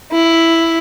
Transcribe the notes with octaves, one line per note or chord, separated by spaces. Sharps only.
E4